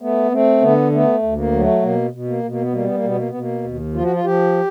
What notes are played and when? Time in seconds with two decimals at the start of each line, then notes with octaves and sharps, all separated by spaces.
0.01 A3 B3
0.32 A3 C4
0.61 D3 B3
0.92 A3 B3
1.23 D2
1.37 A#3
1.52 F#3
1.60 A3
1.82 B2 A#3
2.13 B2
2.28 A#3
2.43 B2
2.51 A#3
2.62 B3
2.73 G3 A#3
2.84 B3
2.95 A#3
3.03 B2 B3
3.17 A#3
3.28 B3
3.34 B2
3.39 A#3
3.64 D#2
3.94 F3 F4
4.03 F#4
4.13 F4
4.24 F3 G4